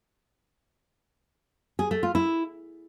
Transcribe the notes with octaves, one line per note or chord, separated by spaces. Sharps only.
G#4
A3
F4
E4